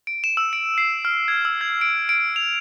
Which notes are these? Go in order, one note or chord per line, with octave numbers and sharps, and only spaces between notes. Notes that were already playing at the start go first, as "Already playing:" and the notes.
D7
E7
E6
D7
C7
F6
G#6
E6
G#6
D7
D7
F7